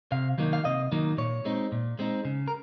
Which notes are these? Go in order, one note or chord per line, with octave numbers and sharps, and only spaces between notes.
C3 F5
D#3 F#3 A#3 D#4
F5
C3 D#5
D#3 F#3 A#3 D#4
A#2 C#5
G#3 C4 D#4
A#2
G#3 C4 D#4
C#3
A#4